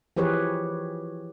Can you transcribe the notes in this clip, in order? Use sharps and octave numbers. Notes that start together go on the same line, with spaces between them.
E3 F3 G4 G#4 B4 C#5